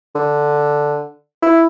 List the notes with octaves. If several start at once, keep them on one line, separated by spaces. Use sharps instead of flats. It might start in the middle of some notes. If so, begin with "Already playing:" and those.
D3
E4